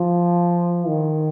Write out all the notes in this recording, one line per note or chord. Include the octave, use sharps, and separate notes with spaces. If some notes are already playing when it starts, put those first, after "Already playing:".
Already playing: F3
D#3